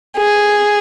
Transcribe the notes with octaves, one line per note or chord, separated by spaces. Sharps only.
G#4